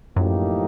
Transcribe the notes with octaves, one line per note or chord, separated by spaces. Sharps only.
F#2 A2 F3 A#3 D#4 G4